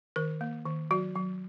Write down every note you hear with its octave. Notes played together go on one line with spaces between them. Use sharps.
D#3 A#4
A#3
D#3
F#3 F#4
F#3